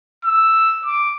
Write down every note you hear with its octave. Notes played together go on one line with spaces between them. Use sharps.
E6
D6